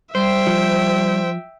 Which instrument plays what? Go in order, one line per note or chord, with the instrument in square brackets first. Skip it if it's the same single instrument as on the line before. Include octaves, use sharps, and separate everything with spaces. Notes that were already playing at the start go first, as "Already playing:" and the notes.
[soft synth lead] G3 [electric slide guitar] C5 [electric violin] E5 G5
[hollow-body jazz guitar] F3